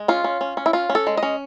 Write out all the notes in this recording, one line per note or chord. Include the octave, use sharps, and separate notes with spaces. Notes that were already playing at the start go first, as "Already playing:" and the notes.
Already playing: G#3
C#4 F4
C#4
C#4
C#4
E4
C#4 F4
C#4
A4
G#3
D#5
C#4